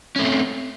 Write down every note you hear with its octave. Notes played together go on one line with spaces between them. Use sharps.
A3 C4 C#4